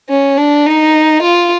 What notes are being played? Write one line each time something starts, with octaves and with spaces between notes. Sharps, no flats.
C#4
D4
D#4
F4